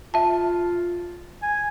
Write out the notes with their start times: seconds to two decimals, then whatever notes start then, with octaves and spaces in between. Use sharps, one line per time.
0.14 F4 E5 A5
1.43 G#5